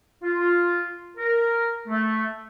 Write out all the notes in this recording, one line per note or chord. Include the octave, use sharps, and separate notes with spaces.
F4
A#4
A3